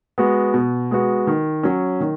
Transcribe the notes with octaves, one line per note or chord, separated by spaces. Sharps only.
G#3 B3 F#4
B2
G#3 B3 F#4
D#3
F#3 C#4
D#3